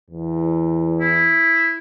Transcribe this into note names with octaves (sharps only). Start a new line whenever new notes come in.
E2
E4